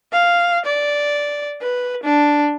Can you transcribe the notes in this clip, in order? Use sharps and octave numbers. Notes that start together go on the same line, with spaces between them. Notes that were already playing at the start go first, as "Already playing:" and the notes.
F5
D5
B4
D4